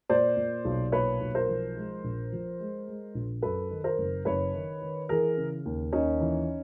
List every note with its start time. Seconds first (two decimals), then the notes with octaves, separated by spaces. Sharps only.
0.09 A#2 C5 D5
0.37 A#2
0.65 B1
0.92 A#2 B4 C#5
1.21 B1
1.35 A#4 C5
1.48 F3
1.76 G#3
2.04 A#1
2.32 F3
2.60 G#3
2.88 G#3
3.15 A#1
3.42 F#2 A4 B4
3.70 D#3
3.84 A#4 C5
3.98 F#1
4.25 F#1 B4 C#5
4.54 D#3
4.81 D#3
5.09 E3 G#4 A#4
5.37 C#3
5.65 D#2
5.93 D#2 C#4 D#4
6.20 E3